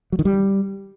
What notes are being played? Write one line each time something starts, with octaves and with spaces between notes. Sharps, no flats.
F#3
D#3
G3